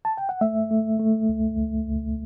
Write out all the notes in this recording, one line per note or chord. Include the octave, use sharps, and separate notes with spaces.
A5
G5
F#5
A3 E5
A3
A3
C#2
C#2
C#2